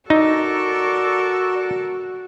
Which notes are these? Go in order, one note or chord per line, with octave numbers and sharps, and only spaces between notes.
D#4 F#4 A4 A#4 D5 C#6 E6